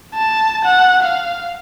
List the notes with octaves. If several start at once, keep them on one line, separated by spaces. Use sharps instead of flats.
A5
F#5
F5